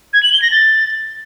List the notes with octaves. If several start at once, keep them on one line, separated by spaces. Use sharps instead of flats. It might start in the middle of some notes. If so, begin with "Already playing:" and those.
G#6
F#7
G7
A#6
A6